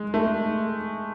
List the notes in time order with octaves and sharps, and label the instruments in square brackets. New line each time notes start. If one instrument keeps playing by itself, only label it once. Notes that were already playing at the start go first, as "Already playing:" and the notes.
Already playing: [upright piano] G#3
A3